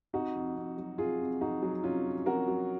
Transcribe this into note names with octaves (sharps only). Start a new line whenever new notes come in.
C3 D#4 F#4
F2
F2
F#3
C3 F4 G#4
F2
F2 D#4 F#4
F#3
C3 C#4 F4
F2
F2 F#4 A#4
F#3